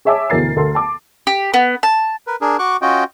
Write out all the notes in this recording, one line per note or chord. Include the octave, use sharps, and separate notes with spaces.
G#4 C#5 E5 G#5 A5 D6
D2 B2 E3 A#4 A6 C7
D2 A4 A#4 C6
A5 D6
G4
B3
A5
A#4 B4
D4 G#4 A#4
F#4 C#6 D6 F#6
C#4 F4 F#4 D#5 G5